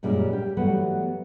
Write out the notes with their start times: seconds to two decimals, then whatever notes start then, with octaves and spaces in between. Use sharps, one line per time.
0.03 F#2 A#2 G3 G#3
0.31 G3 G4
0.57 E3 F#3 G3 A3 B3 F#4